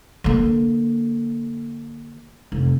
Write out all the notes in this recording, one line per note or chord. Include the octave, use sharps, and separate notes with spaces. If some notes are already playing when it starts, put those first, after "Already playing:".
D3 A#3
F1